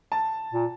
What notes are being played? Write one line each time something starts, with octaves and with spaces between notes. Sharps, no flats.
A5
A#2